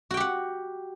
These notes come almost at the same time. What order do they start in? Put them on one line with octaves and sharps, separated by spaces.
F#4 G5 G4 F#5